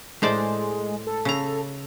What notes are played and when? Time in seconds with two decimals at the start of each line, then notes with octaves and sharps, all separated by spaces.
0.22 A2 G#3 C5 D5
1.07 A4
1.25 C#3 A#5